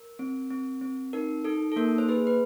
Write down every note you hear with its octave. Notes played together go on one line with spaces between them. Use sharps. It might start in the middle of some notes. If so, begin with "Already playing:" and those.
Already playing: A#4
C4
C4
C4
D#4 A#4
D#4 A4
A4
A#3 A#4
C5
G#4 B4
B4